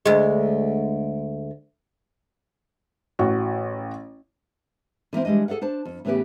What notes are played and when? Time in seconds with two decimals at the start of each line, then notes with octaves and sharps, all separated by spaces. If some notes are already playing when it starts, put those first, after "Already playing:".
0.06 D2 G#3
3.19 A1 F#4
5.13 D3 E3 A#3 C4
5.25 E3 G3 G#3 D4 D#5
5.48 G#4 A4 D5 F5 F#5
5.61 D4 C5 A5
5.85 F2
6.05 A2 C#3 E3 B3 E4 G4